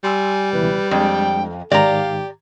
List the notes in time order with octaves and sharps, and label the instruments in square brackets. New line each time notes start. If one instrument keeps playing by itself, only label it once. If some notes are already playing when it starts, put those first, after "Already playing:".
[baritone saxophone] G3 [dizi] G#5 [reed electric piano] C6 E6
[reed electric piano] C#2 B2 E3 [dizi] B4
[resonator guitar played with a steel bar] F2 [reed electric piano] G#3 D4 [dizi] G5
[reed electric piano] G#2 D#3 [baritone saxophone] G4 [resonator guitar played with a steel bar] D5 A#5 [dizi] F5